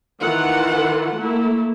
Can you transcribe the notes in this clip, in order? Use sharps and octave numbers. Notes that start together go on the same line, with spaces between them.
D#3 E3 F4 F#5
A3 A#3 E4